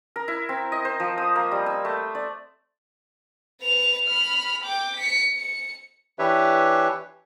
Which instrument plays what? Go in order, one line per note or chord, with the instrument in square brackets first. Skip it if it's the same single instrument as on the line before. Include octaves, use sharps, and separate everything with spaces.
[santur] A#4
E4
C4
D#5
C5
F3
D#6
A#3
G3
E6
A3
D5
[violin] B4 F7
B5 F6
G5 D6
B6 C#7
C#7
[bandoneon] E3 D4 G4 B4 C#5 E5